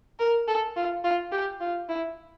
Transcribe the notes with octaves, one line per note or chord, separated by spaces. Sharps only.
A#4
A4
F4
F4
G4
F4
E4